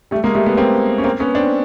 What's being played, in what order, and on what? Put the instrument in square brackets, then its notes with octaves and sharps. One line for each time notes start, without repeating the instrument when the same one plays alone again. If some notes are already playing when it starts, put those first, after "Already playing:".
[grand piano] G3 A3
G#3 A#3
G3 A3
A3 B3
A#3 C4
C#4
A#3 C4
B3 C#4
C4 D4